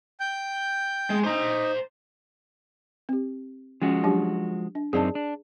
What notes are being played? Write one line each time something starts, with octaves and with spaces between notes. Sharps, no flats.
G5 G6
G#3
D#4 C5 A#5
C4 G4
F3 G#3 C#4 F#4
F#3 D4 G4
D4
F#2 C4 D#4 G#4 D5 A5
D4